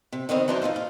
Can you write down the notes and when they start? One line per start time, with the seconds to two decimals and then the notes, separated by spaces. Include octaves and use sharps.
0.12 C3
0.29 D3 D#3 B3 C4 D#4
0.48 F#2 E3 D4 D#4 C5 A5
0.62 A#2 D#4 F4 A4
0.76 F4